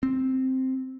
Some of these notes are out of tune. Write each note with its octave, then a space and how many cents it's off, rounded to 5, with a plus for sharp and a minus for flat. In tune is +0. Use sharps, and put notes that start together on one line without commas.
C4 +0